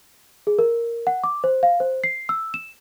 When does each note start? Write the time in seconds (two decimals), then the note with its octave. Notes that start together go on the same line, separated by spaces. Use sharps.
0.47 G#4
0.59 A#4
1.07 F#5
1.24 D6
1.44 C5
1.63 F5
1.80 C5
2.04 C7
2.29 E6
2.54 E7